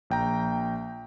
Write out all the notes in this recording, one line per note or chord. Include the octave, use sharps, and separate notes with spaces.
A#1 G5 A#5